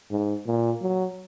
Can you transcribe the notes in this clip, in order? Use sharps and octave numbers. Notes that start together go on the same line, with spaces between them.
G#2
A#2
F#3